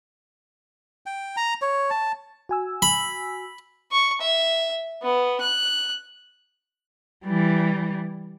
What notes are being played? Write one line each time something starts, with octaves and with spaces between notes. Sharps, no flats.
G5
A#5
C#5
A5
F#4 G#5 E6
B5
C#6
E5
B3
F#6
E3 G3